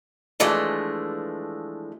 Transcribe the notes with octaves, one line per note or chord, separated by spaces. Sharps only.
E3 F3 G#3 A3 D4